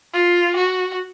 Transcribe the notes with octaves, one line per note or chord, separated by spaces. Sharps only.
F4
F#4